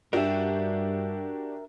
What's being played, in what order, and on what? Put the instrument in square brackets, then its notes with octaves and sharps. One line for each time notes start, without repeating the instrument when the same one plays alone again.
[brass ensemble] G2 [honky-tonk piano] D4 F#4 G4 [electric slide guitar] A#4 E5